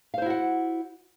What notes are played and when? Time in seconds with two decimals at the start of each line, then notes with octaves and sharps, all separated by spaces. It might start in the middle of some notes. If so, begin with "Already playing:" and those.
0.14 F5
0.18 C5
0.22 E4
0.26 F#4
0.30 F#5